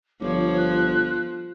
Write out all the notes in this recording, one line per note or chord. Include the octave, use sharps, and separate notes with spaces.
G1 F3 C5 C#5 D6
F#6